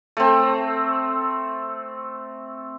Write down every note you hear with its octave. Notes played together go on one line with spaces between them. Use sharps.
A3 C4